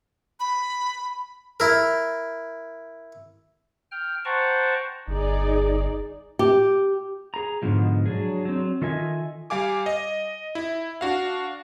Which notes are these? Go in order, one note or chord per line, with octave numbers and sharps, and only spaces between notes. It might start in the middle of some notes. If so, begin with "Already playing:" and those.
B5
E4 A#4
G5 F6
C5 F#5 G5 A5 A#5 C#6
G1 D#4 G#4 D5
G4
G#4 A#5
G#2 B2 D3 F3 G#3
F#3 D4 G#4
F#3 C4
D#3 F4 A4 D#5 E5 G#5
G3 F5 G#5 D6
D#5
E4
D4 F#4 F5